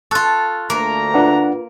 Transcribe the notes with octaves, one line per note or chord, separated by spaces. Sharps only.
F4 A4 C#6 F#6 A6
D2 A3 A#3 A#5
D4 F4 B4 F#5